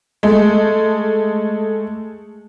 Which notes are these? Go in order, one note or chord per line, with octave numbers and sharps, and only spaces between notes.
G#3 A3